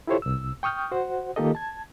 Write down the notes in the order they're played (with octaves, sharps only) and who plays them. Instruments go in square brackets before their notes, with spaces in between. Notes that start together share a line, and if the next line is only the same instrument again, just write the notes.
[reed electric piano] E4 F4 G4 A4 C5 C#5
C2 E6
G5 C#6 D#6 F6 G6
F#4 C5 F#5
D#3 A#3 F4 G4 A4 D#5
A5 G#6